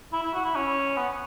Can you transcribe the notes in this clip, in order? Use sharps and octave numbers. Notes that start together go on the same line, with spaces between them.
E4
E4
F#4
E4
C#4
B3